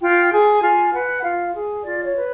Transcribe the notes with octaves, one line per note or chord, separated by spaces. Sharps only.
F4 G5
G#4
F4 G#5
B4 F#5
F4 F5
G#4
F4 D5
C#5
B4